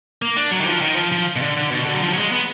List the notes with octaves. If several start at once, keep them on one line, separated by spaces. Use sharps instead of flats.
A#3
D4
F#3
D#3
F3
D#3
F3
F3
B2
D3
D3
B2
D3
F#3
F3
F#3
G#3
B3